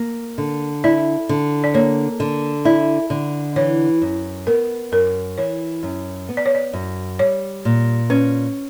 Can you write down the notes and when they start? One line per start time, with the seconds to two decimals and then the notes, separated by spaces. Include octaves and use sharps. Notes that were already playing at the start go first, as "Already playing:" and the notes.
Already playing: A#3
0.38 D3
0.84 E4 D5
1.29 D3
1.64 D5
1.74 A#3 C#5
2.20 D3
2.65 E4 D5
3.10 D3
3.56 E3 C#5
4.02 F#2
4.47 B3 A#4
4.92 F#2 A#4
5.38 E3 C#5
5.83 F#2
6.29 B3
6.37 D5
6.46 C#5
6.55 D5
6.73 F#2
7.19 G3 C#5
7.65 A#2
8.10 C#4 B4